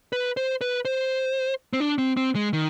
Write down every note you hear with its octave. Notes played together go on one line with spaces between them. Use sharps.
B4
C5
B4
C5
C4
D4
C4
C4
G#3
D#3